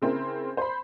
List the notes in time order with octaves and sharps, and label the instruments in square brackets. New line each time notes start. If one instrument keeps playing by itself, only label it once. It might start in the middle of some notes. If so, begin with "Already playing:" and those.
[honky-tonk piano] C#3 C4 E4 A#4
C5 B5